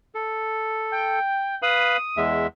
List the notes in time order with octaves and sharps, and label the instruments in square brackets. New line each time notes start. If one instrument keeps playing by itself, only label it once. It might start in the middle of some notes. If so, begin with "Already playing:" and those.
[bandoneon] A4
[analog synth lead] G5
[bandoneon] B4 F5 B5 [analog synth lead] D#6
[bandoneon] E2 G#3 E5